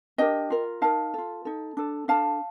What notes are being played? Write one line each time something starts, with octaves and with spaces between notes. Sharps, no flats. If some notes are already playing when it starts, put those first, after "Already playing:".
D4 G4 A#4 D#5 G5
F4 A#4
D#4 A#4 F5 A5
F4 A4
D#4 A4
D4 A4
D4 A4 F5 A5